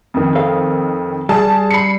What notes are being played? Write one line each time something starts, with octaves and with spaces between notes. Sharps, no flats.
F2 D#3
A4 C5 F5
G3 G#4 A5
B5 C7 C#7